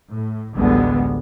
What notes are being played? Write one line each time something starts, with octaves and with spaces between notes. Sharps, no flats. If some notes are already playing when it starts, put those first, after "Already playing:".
A2
A1 D2 D3 G3 G#3 B3